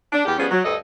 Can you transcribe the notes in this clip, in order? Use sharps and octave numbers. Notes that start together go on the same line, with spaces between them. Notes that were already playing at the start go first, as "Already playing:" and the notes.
D4
E2 G4
F3 G3 B3 C#4 G#4
F#3
D2 G2 A4 D#5